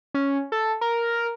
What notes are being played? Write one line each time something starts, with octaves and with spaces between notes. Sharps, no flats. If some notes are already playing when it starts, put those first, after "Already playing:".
C#4
A4
A#4